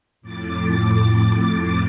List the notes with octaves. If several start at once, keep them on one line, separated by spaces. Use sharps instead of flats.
F2 A2 D6 A6